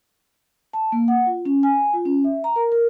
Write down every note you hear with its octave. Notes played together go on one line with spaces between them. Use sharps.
A5
A#3
F#5
F4
C#4
G#5
F4
C#4
E5
A#5
A#4
A#4